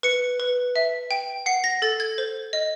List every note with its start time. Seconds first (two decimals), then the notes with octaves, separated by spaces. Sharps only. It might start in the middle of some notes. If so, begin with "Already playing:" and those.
0.03 B4 C#7
0.40 B4
0.76 E5
1.11 G5
1.46 F#5 C7
1.64 A#6
1.82 A4 A6
2.00 G#6
2.18 C5
2.53 D#5